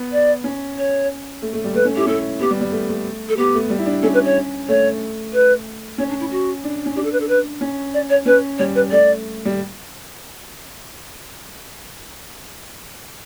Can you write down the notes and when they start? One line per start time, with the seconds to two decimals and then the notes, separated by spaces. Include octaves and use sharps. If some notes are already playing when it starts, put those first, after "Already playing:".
Already playing: B3
0.12 D5
0.44 C#4
0.78 C#5
1.42 A3
1.53 A3
1.64 G3
1.74 A3 B4
1.85 C#4
1.96 E4 G4
2.07 C#4 A4
2.40 B3 G4
2.51 G3
2.61 G3
2.72 A3
2.89 A3
3.29 A4
3.37 B3 G4
3.55 A3
3.70 G3
3.79 E4
3.86 D4
4.03 C#4 A4
4.14 B4
4.25 C#5
4.68 A3 C#5
5.33 B4
5.98 C#4 C#5
6.09 D4
6.20 E4
6.31 F#4
6.64 D4
6.86 C#4
6.96 D4 G4
7.04 A4
7.13 B4
7.20 A4
7.29 B4
7.61 C#4
7.94 D5
8.10 C#5
8.26 C#4 B4
8.58 G3 C#5
8.75 B4
8.91 A3 D5
9.45 G3